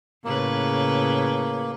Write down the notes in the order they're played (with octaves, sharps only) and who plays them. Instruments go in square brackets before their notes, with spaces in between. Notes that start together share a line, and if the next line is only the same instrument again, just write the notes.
[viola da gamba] A2 C#3 B4 [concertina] A#3